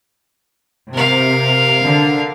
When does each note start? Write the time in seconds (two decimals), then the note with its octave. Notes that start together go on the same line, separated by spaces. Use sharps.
0.93 C3 A#4 F5
1.84 D3